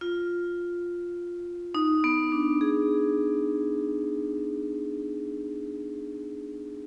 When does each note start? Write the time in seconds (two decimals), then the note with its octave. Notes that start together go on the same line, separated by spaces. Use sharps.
0.01 F4
1.75 D#4
2.04 B3
2.32 D4
2.61 G#4